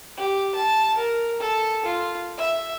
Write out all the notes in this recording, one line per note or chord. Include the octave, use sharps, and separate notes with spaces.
G4
A5
A#4
A4
F4
E5